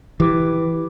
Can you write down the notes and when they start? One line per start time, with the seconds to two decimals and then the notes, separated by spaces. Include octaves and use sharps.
0.20 E3 G4 B4 D6